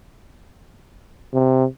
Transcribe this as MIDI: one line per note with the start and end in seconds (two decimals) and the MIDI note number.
1.33 1.65 48